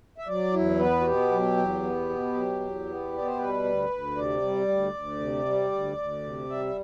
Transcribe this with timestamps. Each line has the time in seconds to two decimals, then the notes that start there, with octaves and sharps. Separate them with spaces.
0.18 E5
0.27 F#3 D5
0.53 E2 E4
0.79 B3 B4
1.01 F#4
1.05 B2 G4
1.31 F#3
1.57 E2
1.83 B3
2.09 B2
2.34 F#3
2.60 E2
2.87 B3
3.13 B2 D5
3.26 C5
3.38 G3 B4
3.64 D2
3.90 D2
4.16 C3 D5
4.42 G3
4.68 D2
4.94 D2
5.20 C3
5.46 G3
5.72 D2
5.98 D2
6.24 C3
6.49 G3 E5